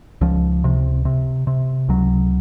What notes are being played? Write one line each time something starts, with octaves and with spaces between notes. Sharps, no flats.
C#2 F3
C3
C3
C3
C#2 F#3